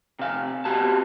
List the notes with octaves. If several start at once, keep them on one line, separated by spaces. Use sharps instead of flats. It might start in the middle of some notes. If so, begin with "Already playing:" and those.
C3 F5
B3 C4 F#4 G4 A5